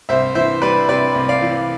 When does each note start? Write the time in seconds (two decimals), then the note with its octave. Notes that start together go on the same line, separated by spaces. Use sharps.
0.09 C2 C5 E5
0.35 E3 C5 E5
0.62 G3 B4 D5
0.89 C3 B4 D5
1.15 C2
1.29 D5 F5
1.42 E3